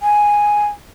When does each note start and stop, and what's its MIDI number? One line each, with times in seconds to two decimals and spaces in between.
0.01 0.67 80